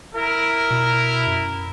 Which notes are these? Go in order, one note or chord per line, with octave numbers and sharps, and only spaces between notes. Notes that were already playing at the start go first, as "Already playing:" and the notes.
E4 A#4
B2
F#2